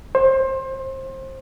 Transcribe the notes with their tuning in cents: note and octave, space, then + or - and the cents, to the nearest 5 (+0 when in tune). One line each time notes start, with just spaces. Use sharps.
C5 +25